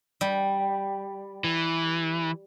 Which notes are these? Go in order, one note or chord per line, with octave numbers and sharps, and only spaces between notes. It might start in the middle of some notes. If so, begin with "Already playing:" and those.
G3
E3